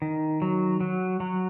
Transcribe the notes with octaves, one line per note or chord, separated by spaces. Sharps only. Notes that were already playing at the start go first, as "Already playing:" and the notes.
D#3
F#3
F#3
F#3